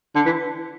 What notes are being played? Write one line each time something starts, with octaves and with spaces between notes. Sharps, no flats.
D3
E3